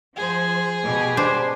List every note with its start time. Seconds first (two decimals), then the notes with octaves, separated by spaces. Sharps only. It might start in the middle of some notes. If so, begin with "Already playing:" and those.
0.16 F3 G#4 C5
0.84 B2 G4
1.17 D4 C5